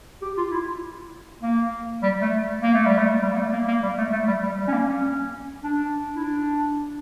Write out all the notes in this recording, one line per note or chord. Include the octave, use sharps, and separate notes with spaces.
G4
F4
E4
A#3
G3
A3
A#3
A3
G3
A3
G3
A#3
A3
A#3
A#3
G3
A3
A3
G3
G3
G3
C#4
A#3
C#4
D4
E4
D4